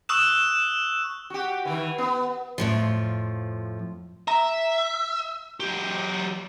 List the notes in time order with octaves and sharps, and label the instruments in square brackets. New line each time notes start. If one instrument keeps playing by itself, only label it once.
[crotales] C#6 D#6 E6 F#6 E7
[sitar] F#4 G4
D#3 E3
B3
[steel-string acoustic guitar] F2 A2 F3
[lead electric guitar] E5 [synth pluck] A#5
[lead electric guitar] F#3 G4